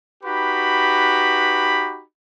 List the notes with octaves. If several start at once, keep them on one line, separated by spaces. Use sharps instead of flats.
D#4 F#4 G4 B4 B5